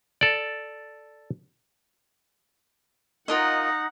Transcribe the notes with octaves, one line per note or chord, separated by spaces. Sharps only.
A4 D5
D#4 F4 A#4 D#5 F#5